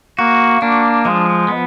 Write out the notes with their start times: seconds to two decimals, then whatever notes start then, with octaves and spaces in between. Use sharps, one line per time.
0.19 A#3 F#4
0.62 A#3 D4
1.05 F3 G#3
1.48 B3